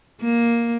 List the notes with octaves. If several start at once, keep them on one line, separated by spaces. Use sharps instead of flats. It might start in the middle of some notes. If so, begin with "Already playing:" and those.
A#3